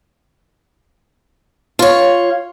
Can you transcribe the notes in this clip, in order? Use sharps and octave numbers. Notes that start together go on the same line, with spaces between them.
F4 C#5